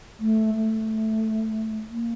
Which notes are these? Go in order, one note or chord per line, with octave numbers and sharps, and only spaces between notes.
A3
A3
A#3